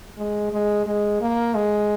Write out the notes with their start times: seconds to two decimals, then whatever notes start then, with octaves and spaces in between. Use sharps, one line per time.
0.18 G#3
0.52 G#3
0.86 G#3
1.21 A#3
1.55 G#3